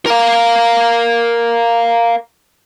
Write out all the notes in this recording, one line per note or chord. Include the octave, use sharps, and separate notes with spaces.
A#4 F5